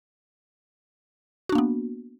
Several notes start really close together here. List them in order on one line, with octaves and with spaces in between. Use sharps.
F#4 D4 A#3 B3